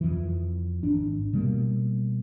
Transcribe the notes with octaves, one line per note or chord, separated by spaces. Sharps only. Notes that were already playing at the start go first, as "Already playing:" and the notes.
F2 E3
G#1 D4
B2 G3 A#3